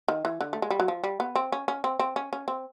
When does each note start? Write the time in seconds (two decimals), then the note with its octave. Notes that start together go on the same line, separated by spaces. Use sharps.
0.08 D#3
0.25 E3
0.41 D3
0.53 A3
0.62 G#3
0.71 G3
0.80 F#3
0.88 F3
1.04 G3
1.20 B3
1.36 C4
1.52 C#4
1.68 C#4
1.84 C4
1.99 C4
2.16 C#4
2.33 C#4
2.48 C4